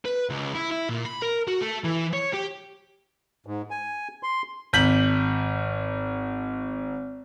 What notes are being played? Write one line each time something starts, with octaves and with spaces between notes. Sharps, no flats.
B4
C#2
E4
E4
A#2
B5
A#4
F#4
A3
E3
C#5
G4
G#2
G#5
C6
G#1 G6 B6 F#7